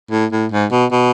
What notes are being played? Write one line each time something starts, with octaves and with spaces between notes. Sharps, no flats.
A2
A2
G#2
B2
B2